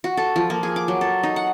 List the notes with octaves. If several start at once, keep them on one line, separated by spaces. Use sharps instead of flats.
F#4
A4
F3
A#3
G#4
D6
F#3
A4
D#4
F#5